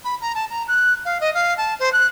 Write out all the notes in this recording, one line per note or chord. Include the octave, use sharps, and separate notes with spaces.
B5
A#5
A5
A#5
F#6
F5
D#5
F5
A5
C5
F#6